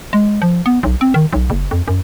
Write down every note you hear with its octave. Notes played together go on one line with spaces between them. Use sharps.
G#3
F3
B3
B1
C4
D#3
B1
F#1
F2
F#2